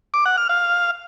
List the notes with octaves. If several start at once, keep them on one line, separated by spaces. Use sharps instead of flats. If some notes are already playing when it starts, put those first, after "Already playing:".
D6
F#5
F6
F5